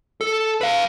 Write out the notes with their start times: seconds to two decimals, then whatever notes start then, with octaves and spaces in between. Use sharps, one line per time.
0.21 A4
0.61 B4 F5